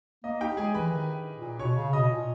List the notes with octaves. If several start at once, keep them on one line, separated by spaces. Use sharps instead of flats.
A#3 D#5
D#4 G4 G5
G#3 G#4 G#5
E3 B4 B5
D#3
A#2
B2 C#5 C#6
C#3
B2 D#5 D#6
A#2